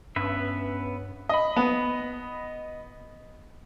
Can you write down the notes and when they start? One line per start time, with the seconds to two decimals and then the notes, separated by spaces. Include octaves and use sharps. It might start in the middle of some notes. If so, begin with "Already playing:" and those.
0.16 G2 B3 C#4 B4 E5
1.29 D#5 B5
1.57 B3